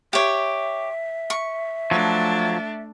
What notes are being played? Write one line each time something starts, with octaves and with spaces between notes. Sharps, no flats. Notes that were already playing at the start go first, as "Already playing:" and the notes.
G4 C#5 E5
C#6
F3 F#3 A3 D4